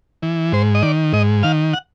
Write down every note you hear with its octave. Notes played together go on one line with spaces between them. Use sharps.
E3
G#2 C5
D#5
D#3 D5
G#2 D#5
D#3 F5
F#5